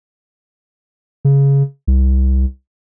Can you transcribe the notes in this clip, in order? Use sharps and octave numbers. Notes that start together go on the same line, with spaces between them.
C#3
C2